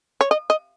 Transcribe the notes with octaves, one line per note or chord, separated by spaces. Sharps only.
C#5
D#5
D#5